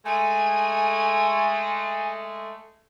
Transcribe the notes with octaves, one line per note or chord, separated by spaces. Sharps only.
G#3 A3 G#5